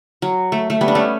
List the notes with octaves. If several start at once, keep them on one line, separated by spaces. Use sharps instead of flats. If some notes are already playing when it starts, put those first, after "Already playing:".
F#3
A3
A3
G3 B3
D4
A3 C#4